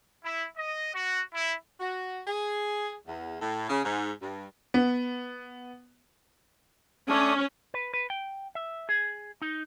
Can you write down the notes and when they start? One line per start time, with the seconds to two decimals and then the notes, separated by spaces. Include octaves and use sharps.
0.24 E4
0.57 D#5
0.94 F#4
1.34 E4
1.80 F#4
2.27 G#4
3.07 E2
3.40 A2
3.69 C#3
3.85 G#2
4.21 G2
4.74 B3
7.09 A3 C#4 D4 D#6
7.74 B4
7.94 B4
8.10 G5
8.55 E5
8.89 G#4
9.42 D#4